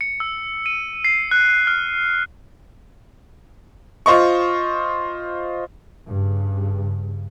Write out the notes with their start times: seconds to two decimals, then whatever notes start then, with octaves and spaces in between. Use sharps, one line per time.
0.01 C#7
0.20 E6
0.66 D#7
1.05 C7
1.31 F#6
1.67 F6
4.06 F4 C5 D#5 C#6
6.04 G2 C#3